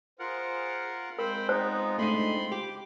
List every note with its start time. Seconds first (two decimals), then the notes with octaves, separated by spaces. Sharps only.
0.19 F4 G#4 A#4 C5 F#5
1.19 G#3 C4 F4 A#4 C5 G5 B5
1.49 B3 D#4 C5
1.99 A3 D4 D#4 B5 C6
2.52 G4 D6